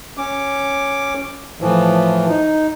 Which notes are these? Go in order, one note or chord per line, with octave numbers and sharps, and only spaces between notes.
C#4 D6
A2 E3 F3
D#4